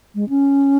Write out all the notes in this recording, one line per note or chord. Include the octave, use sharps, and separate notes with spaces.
G#3
C#4